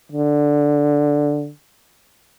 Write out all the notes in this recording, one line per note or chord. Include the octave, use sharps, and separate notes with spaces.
D3